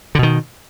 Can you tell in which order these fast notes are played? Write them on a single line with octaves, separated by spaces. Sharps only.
D3 B2 D#3